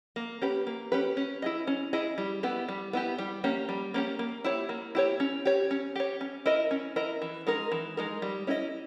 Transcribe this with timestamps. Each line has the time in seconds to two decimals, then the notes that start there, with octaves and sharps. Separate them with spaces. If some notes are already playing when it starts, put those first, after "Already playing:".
0.16 A#3
0.42 C#4 G4 B4
0.67 A#3
0.92 C#4 G4 B4
1.17 C#4
1.42 E4 G#4 D#5
1.67 C#4
1.93 E4 G#4 D#5
2.18 G3
2.43 B3 E4 G4
2.69 G3
2.93 B3 E4 G4
3.18 G3
3.44 A#3 C#4 G4
3.69 G3
3.94 A#3 C#4 G4
4.19 A#3
4.44 E4 G4 C#5
4.69 A#3
4.95 E4 G4 C#5
5.20 C#4
5.45 G4 C#5
5.71 C#4
5.96 G4 C#5
6.21 C#4
6.46 E4 A#4 D#5
6.71 C#4
6.96 E4 A#4 D#5
7.22 E3
7.47 G#3 D#4 A#4
7.72 E3
7.97 G#3 D#4 A#4
8.22 G3
8.47 C#4 E4 A#4 D#5